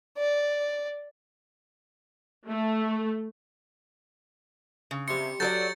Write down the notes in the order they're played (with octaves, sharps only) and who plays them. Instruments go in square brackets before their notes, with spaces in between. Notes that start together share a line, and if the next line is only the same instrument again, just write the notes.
[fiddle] D5
[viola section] A3
[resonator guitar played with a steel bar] C#3
[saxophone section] C3 [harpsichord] G3 C6 [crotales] C#7
[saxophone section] F#3 [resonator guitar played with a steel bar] A4 A#4 D5 [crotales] G6 A6